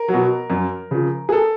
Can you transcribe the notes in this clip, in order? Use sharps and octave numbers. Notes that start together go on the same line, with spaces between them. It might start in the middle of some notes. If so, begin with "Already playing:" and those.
Already playing: A#4
F#3
B2
F#2
C#3 F3
G#4
A4